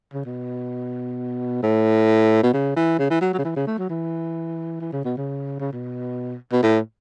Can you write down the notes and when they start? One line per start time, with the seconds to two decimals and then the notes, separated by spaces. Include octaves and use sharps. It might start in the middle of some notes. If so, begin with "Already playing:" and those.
0.14 C#3
0.25 B2
1.62 A2
2.43 B2
2.53 C#3
2.76 E3
2.99 C#3
3.10 E3
3.21 F#3
3.33 F#3
3.38 C#3
3.44 E3
3.56 C#3
3.67 A3
3.78 F#3
3.89 E3
4.80 E3
4.93 C#3
5.05 B2
5.17 C#3
5.60 C#3
5.72 B2
6.52 B2
6.63 A2